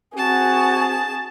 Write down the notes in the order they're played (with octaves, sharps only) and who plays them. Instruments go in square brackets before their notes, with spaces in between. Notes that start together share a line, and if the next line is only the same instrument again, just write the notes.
[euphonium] C4 [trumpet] F#4 [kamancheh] G#4 [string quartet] A5